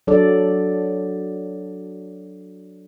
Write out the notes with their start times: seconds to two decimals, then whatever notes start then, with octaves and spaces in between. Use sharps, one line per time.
0.07 F#3 D4 A4 D5